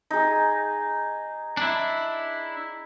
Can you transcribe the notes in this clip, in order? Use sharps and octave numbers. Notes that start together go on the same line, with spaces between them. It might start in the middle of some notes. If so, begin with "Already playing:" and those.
D#4 G#4
D4 E4